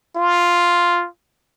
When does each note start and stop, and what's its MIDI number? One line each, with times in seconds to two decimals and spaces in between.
0.16 1.08 65